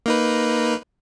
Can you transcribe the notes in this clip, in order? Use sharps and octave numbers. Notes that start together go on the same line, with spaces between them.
A#3 D#4 B4